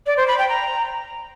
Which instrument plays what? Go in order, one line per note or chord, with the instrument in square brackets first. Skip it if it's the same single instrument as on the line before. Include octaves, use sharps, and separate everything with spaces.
[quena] D5
C5
B5
G5
A#5